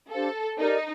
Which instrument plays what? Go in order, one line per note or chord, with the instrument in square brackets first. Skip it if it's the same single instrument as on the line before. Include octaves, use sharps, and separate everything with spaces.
[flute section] D4 G4 C5 F5 [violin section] A4
[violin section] D#4 [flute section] G4 A#4 D5